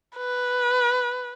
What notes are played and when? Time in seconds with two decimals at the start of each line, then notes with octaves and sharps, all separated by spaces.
0.16 B4